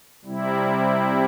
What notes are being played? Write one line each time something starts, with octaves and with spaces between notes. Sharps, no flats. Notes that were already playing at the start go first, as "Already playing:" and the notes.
C3 G3 C4 E4